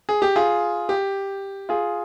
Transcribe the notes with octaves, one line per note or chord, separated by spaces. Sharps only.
G#4
G4
F4 G#4
G4
F4 G#4